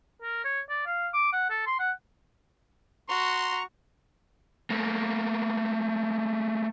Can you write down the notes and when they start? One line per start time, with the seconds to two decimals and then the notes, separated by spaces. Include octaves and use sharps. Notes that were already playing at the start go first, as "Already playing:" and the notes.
0.22 A#4
0.44 C#5
0.69 D5
0.87 F5
1.13 D6
1.33 F#5
1.50 A4
1.67 C6
1.80 F#5
3.09 F#4 A#5 C6 C#6
4.70 A3 A#3